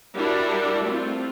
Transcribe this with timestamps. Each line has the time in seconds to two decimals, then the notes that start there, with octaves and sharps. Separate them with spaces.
0.14 G3 D4 E4 F#4 A#4
0.84 A3 C4 F4